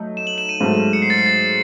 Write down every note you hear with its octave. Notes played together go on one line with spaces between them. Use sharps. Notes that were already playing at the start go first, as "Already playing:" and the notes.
Already playing: F#3 A3 D#4
E7
F#7
E7
D#7
G#2 F#3 A3
C#7
C7
A6
C7
A6